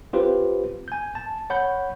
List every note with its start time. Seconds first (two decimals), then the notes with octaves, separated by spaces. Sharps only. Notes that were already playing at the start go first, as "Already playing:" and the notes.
0.13 C4 F4 G4 B4 C5
0.88 G#5 G6
1.15 A5
1.50 C#5 F#5 B5 G6